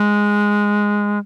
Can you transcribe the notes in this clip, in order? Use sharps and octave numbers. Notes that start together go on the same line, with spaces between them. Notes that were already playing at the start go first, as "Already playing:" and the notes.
Already playing: G#3